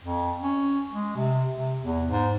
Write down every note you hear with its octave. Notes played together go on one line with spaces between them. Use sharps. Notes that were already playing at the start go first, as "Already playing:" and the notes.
F2
C#4
G#3
C3
C3
E2
G#2